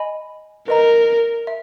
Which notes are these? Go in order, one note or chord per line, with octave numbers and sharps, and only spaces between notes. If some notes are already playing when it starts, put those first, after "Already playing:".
Already playing: D#5 G#5 B5
A#4 B4 D#5 A#5
E5